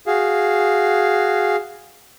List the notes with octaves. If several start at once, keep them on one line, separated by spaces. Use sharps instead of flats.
F#4 G#4 F5